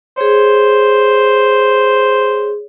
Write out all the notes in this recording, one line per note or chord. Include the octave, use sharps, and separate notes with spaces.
G#4 C5 C#5